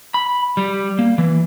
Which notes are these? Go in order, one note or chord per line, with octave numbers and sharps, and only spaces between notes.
B5
G3
A#3
E3